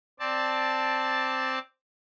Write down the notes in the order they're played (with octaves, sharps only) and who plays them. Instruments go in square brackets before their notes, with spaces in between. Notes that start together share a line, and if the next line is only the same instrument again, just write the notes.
[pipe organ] C4 D5 A5